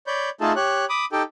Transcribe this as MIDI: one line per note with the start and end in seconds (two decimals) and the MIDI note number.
0.07 0.30 73
0.07 0.30 74
0.07 0.30 83
0.07 0.30 91
0.41 0.53 57
0.41 0.53 63
0.41 0.53 65
0.41 0.53 68
0.41 0.53 69
0.41 0.53 81
0.56 0.85 67
0.56 0.85 73
0.56 0.85 90
0.90 1.05 83
0.90 1.05 86
0.90 1.05 87
1.12 1.23 63
1.12 1.23 67
1.12 1.23 69
1.12 1.23 79